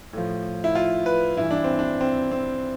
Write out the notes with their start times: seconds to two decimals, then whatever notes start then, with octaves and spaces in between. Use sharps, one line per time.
0.13 A2 F3
0.64 E4
0.75 F4
1.06 B4
1.37 G2 E3 E4
1.51 D4
1.64 C4
1.79 D4
2.01 C4
2.31 C4